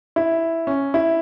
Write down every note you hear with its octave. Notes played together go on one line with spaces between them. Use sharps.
E4
C#4
E4